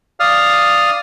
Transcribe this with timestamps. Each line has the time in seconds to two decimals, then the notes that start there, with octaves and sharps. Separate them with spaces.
0.20 D5 F5 D#6 F6